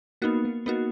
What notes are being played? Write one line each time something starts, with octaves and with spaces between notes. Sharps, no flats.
A#3 B3 D#4 F#4
A#3
A#3 B3 D#4 F#4